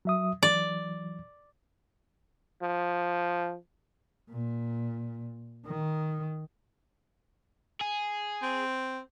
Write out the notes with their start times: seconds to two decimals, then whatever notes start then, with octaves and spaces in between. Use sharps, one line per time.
0.05 F#3 E5 D#6
0.43 E3 F#3 D5
2.62 F3
4.31 A#2
5.66 D#3
7.81 G#4
8.42 C4